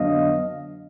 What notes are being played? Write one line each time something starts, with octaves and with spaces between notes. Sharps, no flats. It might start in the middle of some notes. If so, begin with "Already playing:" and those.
Already playing: F2 D3 F#3 B3 D4 D#5 F5